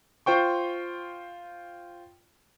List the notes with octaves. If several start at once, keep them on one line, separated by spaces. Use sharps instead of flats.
F4 C5 G5 C#6